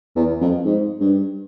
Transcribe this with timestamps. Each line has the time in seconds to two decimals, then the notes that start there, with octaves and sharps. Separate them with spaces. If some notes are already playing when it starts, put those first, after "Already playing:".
0.16 E2
0.41 F2
0.65 G#2
1.00 G2